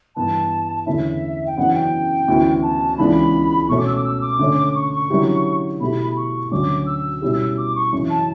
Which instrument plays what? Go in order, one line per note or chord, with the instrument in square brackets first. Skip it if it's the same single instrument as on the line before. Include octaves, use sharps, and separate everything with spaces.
[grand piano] G2 E3 B3 [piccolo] A5
[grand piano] E2 D3 A3 C#4 E4 [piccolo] E5
[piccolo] G5
[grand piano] F#2 C#3 E3 B3 D4 [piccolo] F#5
[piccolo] G5
[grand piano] D2 C#3 E3 B3 E4
[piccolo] A5
[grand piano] C#2 C#3 E3 B3 D4 [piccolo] B5
[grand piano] B2 A3 C#4 [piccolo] C#6
[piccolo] D6
E6
D6
E6
D6
[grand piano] D3 A3 C#4
[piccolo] C#6
C#6
[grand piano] D3 F#3 C#4 E4 G4
[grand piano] B2 A3 E4 G4 [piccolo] B5
[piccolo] C#6
[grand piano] D2 D3 F#3 C#4 F#4 [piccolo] D6
[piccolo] E6
[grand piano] B2 G3 C#4 E4 G4
[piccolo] D6
C#6
[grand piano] F#2 C#3 E3
[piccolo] A5